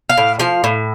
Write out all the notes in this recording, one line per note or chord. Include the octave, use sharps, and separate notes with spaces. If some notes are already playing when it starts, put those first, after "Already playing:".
F5
A2
F3 F5
A2